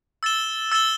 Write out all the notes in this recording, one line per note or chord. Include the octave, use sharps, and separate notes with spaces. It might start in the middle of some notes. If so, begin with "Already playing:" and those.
E6 A6 E7 G7
E6 A6 E7 G7